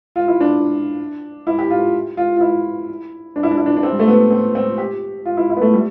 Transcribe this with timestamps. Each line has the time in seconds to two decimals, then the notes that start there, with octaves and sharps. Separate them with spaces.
0.16 F4
0.28 E4
0.41 D4
1.47 E4
1.58 G4
1.70 F4
2.17 F4
2.37 F4
2.41 E4
3.36 D4
3.43 E4
3.51 D4
3.58 E4
3.66 D4
3.76 D4
3.83 C4
3.92 G3
3.99 A3
4.08 B3
4.31 C4
4.55 C4
4.78 G4
5.26 F4
5.37 E4
5.50 E4
5.57 B3
5.61 A3
5.74 G3